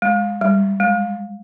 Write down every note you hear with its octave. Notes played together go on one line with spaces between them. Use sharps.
G#3
G3
G#3